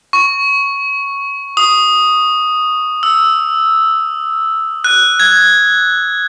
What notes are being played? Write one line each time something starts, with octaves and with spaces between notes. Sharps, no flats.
C#6
D#6
E6
F#6
G#6